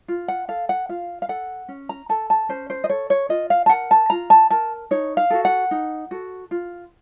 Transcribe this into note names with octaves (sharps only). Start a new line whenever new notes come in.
F4
F#5
A4 F5
F#5
F4 F5
F5
A4 F#5
C#4
A#5
A4 A5
A5
C#4 C5
C5
D#5
A4 C#5
C#5
F4 D#5
F5
A5
A#4 F#5
A5
F4 A#5
A5
A#4 A5
D#4 C#5
F5
F#4 A4
F#5
D#4
F#4 A4
F4